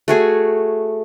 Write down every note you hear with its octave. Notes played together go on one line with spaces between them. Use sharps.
A3 F#4 G#4